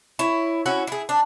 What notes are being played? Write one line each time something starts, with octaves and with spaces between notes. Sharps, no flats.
E4 C#5
C#4 E4 F#4
E4 G#4
D4